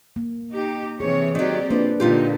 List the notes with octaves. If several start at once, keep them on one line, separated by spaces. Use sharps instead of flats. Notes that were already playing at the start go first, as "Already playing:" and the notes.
A#3
D#4 G4
C3 E3 G#4 C#5
D#3 F#3 C4 G4 D5
F3 A#3 D4 B4
A#2 D3 D#4 F4 G4